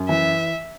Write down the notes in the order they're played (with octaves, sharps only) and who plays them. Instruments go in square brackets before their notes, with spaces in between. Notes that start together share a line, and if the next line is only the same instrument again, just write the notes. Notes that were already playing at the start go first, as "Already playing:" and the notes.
Already playing: [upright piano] F#2
[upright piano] E3 [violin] E5